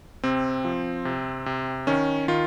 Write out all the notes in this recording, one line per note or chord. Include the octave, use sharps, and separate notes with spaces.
C3 C4
F3
C3
C3
D#3 C#4
D#3 F4